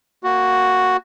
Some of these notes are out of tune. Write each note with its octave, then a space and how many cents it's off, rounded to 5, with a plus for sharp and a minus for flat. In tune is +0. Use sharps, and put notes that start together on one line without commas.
A#3 -5 F#4 +0